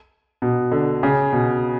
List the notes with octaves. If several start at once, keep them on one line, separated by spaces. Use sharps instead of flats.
B2
D3
C#3
B2